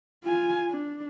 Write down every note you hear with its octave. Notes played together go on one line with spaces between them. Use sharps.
F4 G#5
D4